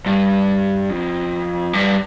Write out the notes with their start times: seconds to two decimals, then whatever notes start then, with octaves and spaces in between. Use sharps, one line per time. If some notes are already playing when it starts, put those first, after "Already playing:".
0.06 G2
0.90 F2
1.73 G2